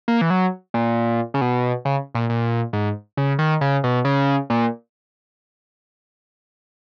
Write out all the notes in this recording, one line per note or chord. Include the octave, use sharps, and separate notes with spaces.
A#3
E3
F#3
A#2
C#3
B2
C#3
A#2
A#2
G#2
C#3
D#3
C#3
B2
C#3
A#2